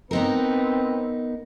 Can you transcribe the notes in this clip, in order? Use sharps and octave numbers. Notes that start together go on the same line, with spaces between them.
B3 C4 D#4 A#4 B4